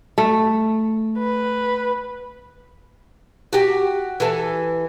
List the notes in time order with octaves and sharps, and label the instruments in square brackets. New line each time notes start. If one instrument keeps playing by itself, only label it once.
[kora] A3
[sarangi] B4
[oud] F#4 G4
E3 A4